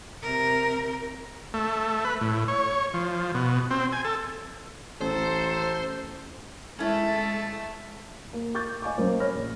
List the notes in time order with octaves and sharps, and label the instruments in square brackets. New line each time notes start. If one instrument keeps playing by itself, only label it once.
[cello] C3 A#4
[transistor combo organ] A3
B4
A2
C#5
F3
B2
C4
G#5
A4
[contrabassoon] A1 [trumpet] A4 [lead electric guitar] C5
[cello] G#3 A4 [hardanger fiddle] A3 E5 [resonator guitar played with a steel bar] C#4 E4
[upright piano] A#3
C#6 D6 G6 A6
D#5 F5 G#5 C#6 D6
F#3 A#3 C#4 A#4 C5
C#5 B5 F6 A#6
A#1